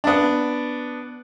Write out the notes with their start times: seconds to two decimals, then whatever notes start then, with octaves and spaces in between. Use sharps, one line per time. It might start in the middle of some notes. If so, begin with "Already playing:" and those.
0.04 B3 D4